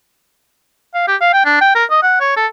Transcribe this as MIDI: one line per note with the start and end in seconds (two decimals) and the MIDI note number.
0.94 1.04 77
1.08 1.16 67
1.21 1.30 77
1.33 1.43 79
1.45 1.59 62
1.61 1.73 79
1.75 1.84 70
1.90 2.00 75
2.02 2.17 78
2.20 2.36 73
2.36 2.46 69